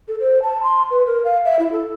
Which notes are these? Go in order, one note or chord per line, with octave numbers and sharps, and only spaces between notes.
A4
C5
A5
C6
B4
A#4
F5
E5
E4
A4